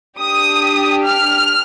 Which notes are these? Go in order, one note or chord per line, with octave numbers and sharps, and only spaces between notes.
D4 G4 D#6
F6